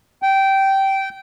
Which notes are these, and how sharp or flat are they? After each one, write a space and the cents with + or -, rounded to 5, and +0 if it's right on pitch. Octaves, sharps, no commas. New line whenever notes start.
G5 -15